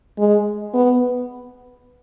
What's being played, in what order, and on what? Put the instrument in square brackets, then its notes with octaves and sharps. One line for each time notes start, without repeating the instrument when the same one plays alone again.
[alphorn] G#3
B3